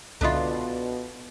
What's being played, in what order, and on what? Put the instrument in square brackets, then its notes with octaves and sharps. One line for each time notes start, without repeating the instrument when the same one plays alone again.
[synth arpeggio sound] C#2 D#5 [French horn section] B2 [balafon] D3 E5 B5 [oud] D4 F4